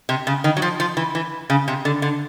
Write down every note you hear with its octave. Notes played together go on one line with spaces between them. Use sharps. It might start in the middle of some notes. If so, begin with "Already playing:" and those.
C3
C#3
D#3
F#3
F3
F3
E3
E3
C#3
C3
D3
D3